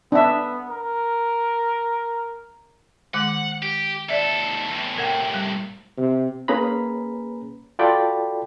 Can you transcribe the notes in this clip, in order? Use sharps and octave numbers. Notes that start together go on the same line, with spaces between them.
B3 D4 E5
A#4
D#3 G#3 F#5 D6
G4
D#2 A4 D5 E5
E2 A2
A2 C3 A#4 F#5 G5
G3
C3
A#3 C#4 G#4 B4 A#5 B5
F4 F#4 A4 D5 G5 B5